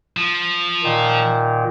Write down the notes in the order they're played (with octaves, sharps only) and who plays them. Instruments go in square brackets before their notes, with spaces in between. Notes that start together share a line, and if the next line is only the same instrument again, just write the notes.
[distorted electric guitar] F3
[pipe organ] A#2 D#3